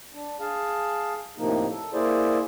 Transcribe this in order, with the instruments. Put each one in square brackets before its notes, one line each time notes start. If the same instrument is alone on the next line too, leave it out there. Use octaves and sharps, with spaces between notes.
[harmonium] D4
G#4 F5 A5
A2 C3 F3 A#3 D#4
A4
A#3 E4 G#4 C5 D5